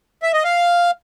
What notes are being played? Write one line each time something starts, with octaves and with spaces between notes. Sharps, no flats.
E5
D#5
F5